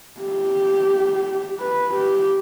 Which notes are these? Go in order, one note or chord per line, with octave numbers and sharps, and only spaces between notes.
G4
B4
G4